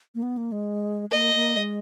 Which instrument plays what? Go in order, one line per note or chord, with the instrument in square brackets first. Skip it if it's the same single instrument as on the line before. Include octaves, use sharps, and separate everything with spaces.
[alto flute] A#3
B3
A#3
G#3
[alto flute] A#3 [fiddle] D#5
[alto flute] A#3
G#3